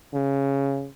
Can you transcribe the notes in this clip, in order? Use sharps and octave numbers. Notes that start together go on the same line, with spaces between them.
C#3